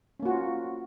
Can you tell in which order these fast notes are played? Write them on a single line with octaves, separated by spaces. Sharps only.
C#4 A#3 F#4 F4